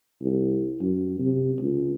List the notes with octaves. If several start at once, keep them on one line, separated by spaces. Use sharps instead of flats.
C2
F#2
C3
C#2